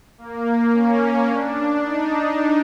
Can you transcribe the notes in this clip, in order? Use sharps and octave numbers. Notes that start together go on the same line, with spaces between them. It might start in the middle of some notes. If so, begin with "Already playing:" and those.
A#3
C#4
D4
D#4